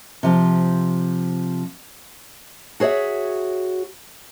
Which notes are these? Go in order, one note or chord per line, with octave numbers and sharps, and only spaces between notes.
C3 F3
F#4 G#4 C#5 D#5 E5